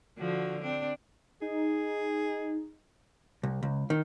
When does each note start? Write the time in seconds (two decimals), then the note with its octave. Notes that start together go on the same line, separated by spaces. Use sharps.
0.18 D3 F3 F#4
0.62 C4 D4
1.42 D#4 G#4
3.43 C2
3.63 C#2
3.90 D#3